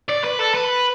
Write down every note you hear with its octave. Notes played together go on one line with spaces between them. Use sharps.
D5
B4
A4
B4